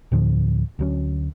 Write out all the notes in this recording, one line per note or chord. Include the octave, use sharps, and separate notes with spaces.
D2 A2 D3 F3
D2 F#3 C#4